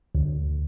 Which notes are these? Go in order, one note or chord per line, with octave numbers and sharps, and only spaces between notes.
D2